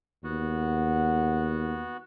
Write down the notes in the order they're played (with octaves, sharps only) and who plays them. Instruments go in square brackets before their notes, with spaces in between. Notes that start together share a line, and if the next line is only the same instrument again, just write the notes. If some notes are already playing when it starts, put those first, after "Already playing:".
[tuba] D#2 [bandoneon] B3 F#4